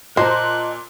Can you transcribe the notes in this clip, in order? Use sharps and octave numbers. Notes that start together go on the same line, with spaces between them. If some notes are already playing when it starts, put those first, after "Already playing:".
A#2 C5 D#5 A5 A#5 F#6